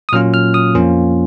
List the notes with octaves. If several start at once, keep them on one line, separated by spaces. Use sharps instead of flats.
D#6
A#2 F#3 A#3 C#4 F4 F6
F6
D#6
F2 F3 A#3 C#4 F4